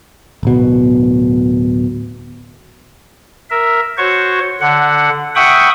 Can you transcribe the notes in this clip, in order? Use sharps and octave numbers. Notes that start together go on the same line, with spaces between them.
D1 B2
A#4 E5
F#4 C5 C#5 C#6
D3 F#5
E5 F#5 G5 B5 C#6 D#6